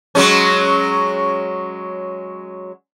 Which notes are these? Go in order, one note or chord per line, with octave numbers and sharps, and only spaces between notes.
F#3 G#3 C#4